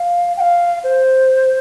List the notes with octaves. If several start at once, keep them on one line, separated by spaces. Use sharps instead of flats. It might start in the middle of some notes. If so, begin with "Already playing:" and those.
Already playing: F5
G5
F5
C5